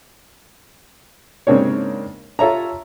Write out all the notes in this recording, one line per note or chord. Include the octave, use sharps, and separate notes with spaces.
G#2 C#3 A#3 C4 D4 C#5
F4 A4 C#5 E5 A#5